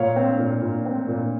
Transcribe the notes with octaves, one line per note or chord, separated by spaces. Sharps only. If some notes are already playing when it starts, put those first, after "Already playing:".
Already playing: A#2 C#5 F5
C4
A#2
A#2
C4
A#2